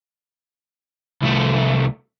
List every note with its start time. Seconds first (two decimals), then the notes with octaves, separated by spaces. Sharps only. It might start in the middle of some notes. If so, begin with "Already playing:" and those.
1.22 C2 A3